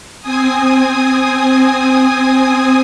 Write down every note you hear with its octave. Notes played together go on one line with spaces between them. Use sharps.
C4 G#5 D#6